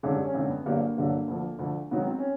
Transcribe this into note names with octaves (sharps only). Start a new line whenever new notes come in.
G#1 F#2 D3 G#3
G3
C#4
G#1 F#2 D3 C4
B3
G1 G2 D3 F#3 A#3
G1 G2 D3 F#3
D2 D3 F3
D2 D3 F3
G#1 G#2 D#3 F#3 B3
C4
C#4